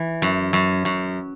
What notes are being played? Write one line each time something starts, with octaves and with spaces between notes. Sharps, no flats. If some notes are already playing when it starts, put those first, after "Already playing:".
Already playing: E3
F#2
F#2
F#2